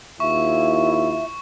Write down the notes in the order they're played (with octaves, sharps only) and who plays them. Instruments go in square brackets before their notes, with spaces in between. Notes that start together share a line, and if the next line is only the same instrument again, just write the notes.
[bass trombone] D#2 [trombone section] E4 F4 [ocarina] E5 [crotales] C#6